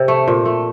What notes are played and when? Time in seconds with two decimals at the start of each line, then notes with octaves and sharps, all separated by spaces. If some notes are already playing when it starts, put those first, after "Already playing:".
Already playing: C3
0.08 A3
0.28 A#2
0.45 A3